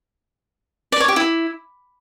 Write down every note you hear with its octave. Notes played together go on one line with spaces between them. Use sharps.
D5
C#5
G4
E4